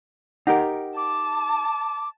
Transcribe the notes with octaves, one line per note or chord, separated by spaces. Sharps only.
D#4 G4 A#4 F#5
A5 D6